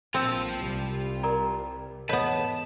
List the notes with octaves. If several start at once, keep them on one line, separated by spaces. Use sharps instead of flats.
A#1 C4 F4 G5 A5 E6
C2 C3 G3
A#4 D5 A#5
E2 G#2 B3 B4 C#5 D#5 A5